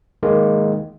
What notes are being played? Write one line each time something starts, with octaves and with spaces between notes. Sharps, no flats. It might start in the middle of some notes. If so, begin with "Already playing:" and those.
D#3 G#3 A#3